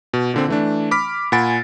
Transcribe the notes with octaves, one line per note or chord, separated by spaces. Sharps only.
B2
A#2 D3 C4
E3 A3 D4
B5 D6 F6 B6
A#2 F#5 G#5 B5 A6 D7